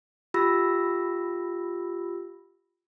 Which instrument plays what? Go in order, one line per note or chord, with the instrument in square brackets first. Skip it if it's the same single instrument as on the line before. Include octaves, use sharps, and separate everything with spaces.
[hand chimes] F4 G4 B5 E6 A#6